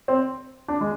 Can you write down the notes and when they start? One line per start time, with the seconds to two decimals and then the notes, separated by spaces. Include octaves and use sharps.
0.08 C4
0.68 D4
0.81 G#3